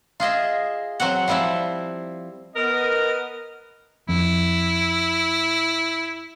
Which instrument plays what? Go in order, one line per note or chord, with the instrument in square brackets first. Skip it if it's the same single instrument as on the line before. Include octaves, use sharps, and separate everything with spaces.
[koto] F4 G#4 D#5 E5
F#3 C4 F#4 F#5
F3 G3 C4 E4 E5
[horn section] B3 A#4 D#5
[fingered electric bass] F2 [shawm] E4